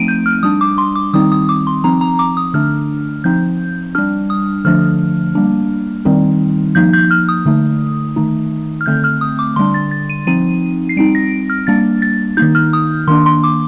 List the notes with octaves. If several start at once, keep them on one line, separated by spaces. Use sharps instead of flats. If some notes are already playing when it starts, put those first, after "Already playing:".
Already playing: F3 A3 C4 D#4 D7 D#7
G6
F6
G3 D4 D#6
D6
C6
D6
D#3 G3 C4 D#4 D#6
D#6
D6
C6
F3 C4 D#4 A#5
A#5
D6
D#6
D3 A3 D4 F6
F3 C4 D#4 G6
G3 D4 F6
D#6
D3 F3 A3 D4 F6
G3 A#3 D4
D#3 G3 C4 D#4
F3 A#3 D#4 G6
G6
F6
D#6
D3 A3 D#4
D#3 A3 D#4
F6
D3 A3 C4 G6
F6
D#6
D6
D3 G3 D4 C6
A6
A6
D#7
F3 C4 D#4 D#7
C7
G3 C4 D#4 D7
A#6
F6
G3 A#3 D4 A6
A6
D#3 A#3 D#4 G6
F6
D#6
D#3 A#3 D4 C6
C6
D6